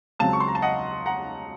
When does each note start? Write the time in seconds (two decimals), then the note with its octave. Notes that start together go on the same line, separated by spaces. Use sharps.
0.19 C#2 C#3 F#3 C4 F5 A5
0.33 C#6
0.40 C6
0.48 A#5
0.55 A5
0.62 D#5 F#5
1.06 F#5 A#5